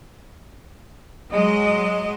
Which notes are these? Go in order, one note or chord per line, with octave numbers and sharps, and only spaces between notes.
F#3 G#3 D#5